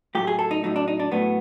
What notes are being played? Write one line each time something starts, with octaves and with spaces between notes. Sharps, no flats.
A2 F#3 A3 G4
G#4
A4
D#4
A2 F#3 A3 D#4
D4
D#4
D4
A2 F#3 A3 B3